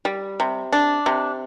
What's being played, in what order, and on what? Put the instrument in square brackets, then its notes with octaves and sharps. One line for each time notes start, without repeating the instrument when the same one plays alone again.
[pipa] G3
C3
D4
C3